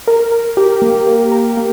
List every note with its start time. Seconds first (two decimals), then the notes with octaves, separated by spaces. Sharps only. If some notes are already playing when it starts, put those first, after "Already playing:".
0.07 A#4
0.32 A#4
0.57 G4
0.82 A#3
1.07 A#3
1.32 A#4
1.57 A#3